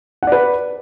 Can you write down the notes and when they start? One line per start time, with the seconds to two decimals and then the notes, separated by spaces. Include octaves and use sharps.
0.23 F#5
0.27 D5
0.32 B4